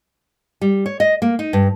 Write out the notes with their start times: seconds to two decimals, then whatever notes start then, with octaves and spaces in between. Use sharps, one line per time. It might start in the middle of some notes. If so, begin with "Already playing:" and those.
0.61 G3
0.86 C#5
1.00 D#5
1.22 A#3
1.39 D#4
1.53 G2